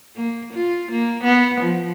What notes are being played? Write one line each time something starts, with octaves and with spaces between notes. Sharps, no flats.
A#3
F4
A#3
B3
F3